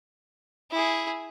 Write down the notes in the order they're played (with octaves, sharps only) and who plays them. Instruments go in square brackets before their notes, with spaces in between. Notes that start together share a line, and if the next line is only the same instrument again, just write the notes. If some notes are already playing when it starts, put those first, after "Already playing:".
[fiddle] E4 G#4